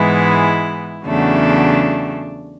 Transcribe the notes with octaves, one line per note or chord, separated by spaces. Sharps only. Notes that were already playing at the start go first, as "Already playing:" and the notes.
Already playing: G#2 E3 G#3 B3 E4
E2 C#3 F#3 A3 D4